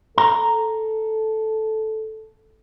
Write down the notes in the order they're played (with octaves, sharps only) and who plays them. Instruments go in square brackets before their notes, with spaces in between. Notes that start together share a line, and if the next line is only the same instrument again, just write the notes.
[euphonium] A4 [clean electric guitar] A#5